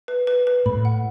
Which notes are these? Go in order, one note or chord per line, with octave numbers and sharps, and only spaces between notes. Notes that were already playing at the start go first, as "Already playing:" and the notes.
B4
B4
B4
A2 B5
F#5